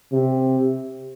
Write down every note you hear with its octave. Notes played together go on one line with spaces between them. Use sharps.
C3